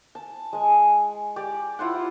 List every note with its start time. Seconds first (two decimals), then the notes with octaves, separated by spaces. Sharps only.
0.15 A5
0.53 G#3 G#5
1.36 G4 D5
1.79 E4 F4 C5 F#5